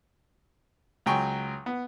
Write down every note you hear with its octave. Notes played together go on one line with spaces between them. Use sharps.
C#2 F#3 G5 G#5 C#6
B3